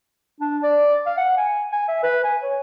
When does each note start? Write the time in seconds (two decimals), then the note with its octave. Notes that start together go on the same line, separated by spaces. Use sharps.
0.40 D4
0.63 D5
1.06 F5
1.17 F#5
1.37 G#5
1.72 G#5
1.88 E5
2.03 B4
2.24 G#5
2.42 C#5